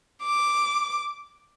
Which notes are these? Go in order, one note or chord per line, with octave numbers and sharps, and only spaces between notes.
D6